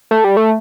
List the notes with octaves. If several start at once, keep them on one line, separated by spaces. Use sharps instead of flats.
A3
G3
A3